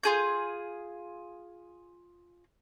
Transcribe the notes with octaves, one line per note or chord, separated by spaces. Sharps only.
F4 G#4 G6